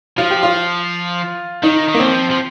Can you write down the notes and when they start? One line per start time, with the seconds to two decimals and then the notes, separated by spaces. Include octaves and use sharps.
0.18 F3 F4
0.31 G4
0.43 F4
1.63 D#3 D#4
1.88 D#3
1.94 A#3
1.99 F3 C4
2.31 F3